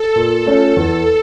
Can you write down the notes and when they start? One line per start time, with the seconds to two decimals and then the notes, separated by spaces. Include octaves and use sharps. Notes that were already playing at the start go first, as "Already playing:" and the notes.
Already playing: A4
0.15 A#2 A4
0.46 A3 C#4 F4
0.77 E2